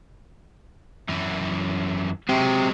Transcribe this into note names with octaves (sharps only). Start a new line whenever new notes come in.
F#2 E3
F#3 G#3 C4 G4